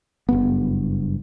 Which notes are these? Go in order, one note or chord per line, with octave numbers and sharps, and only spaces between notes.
F#1 G2 B3